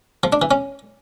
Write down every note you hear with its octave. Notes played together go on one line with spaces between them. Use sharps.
F3
D4
E3
C#4